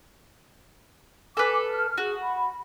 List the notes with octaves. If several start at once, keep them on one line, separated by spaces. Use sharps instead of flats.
A4 B4 G#5 D6
F6
F#4 G#4
B5